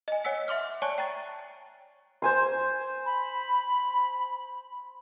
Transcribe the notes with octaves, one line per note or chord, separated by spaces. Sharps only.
D#5 G#5
C#5 F#5 G#5 E6 B6
E5 C6 D6 F6
C#5 D5 G#5 A5 C#6 F#6
G5 A#5 A6
C5 G#5 C6
B5